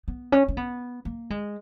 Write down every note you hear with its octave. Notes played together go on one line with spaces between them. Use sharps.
B3
C#4
C#4
B3
A#3
G#3